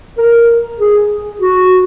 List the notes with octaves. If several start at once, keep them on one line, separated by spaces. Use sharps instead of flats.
A#4
G#4
F#4